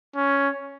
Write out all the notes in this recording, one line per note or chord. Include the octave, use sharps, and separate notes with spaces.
C#4